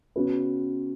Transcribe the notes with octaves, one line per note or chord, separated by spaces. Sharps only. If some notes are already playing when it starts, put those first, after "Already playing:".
C#3 B3 F#4 B4